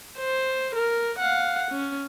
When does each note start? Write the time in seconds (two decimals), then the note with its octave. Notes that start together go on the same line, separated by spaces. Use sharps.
0.18 C5
0.75 A#4
1.19 F5 F#5
1.71 C#4